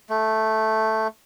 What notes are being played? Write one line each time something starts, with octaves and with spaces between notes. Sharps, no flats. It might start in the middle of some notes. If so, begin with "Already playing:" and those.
A3